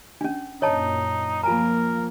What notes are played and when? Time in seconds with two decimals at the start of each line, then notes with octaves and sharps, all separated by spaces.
0.21 C#4 D4
0.62 F#2 A#2 D#4 C#5 D#5 A5
1.44 F3 A#3 F4 A#4 G#5 A#5